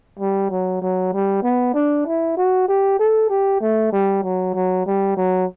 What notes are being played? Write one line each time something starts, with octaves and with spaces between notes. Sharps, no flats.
G3
F#3
F#3
G3
B3
D4
E4
F#4
G4
A4
G4
A3
G3
F#3
F#3
G3
F#3